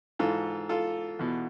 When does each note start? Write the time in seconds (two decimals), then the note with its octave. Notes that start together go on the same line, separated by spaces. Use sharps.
0.19 G#2 E3 F4 A4
0.69 F4 A4
1.19 E2 B2